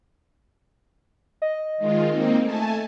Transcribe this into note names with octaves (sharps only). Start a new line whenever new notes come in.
D#5
D#3 G#3 F4
A#3 C4 D#4
A3 G#5 A5